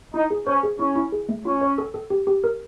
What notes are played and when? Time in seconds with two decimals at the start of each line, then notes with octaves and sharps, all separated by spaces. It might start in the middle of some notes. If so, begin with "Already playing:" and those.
0.14 D#4 E4
0.30 G#4
0.47 C#4 C5
0.63 G#4
0.79 C#4 E4
0.96 E4
1.12 G#4
1.29 A3
1.45 C#4 F4
1.61 C#5
1.78 A4
1.94 A4
2.10 G4
2.27 G4
2.44 A#4